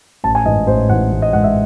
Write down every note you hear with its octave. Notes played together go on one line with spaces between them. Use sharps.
A1 A5
G#5
G#2 E3 G#3 D#5
A1 C5
G#2 E3 G#3 F#5
A1
D#5
G#2 E3 G#3 F#5
E5